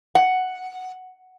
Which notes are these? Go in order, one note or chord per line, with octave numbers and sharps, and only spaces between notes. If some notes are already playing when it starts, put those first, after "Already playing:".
F#5